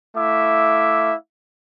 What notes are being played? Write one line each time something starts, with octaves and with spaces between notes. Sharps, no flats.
A3 E4 E5 F5 D6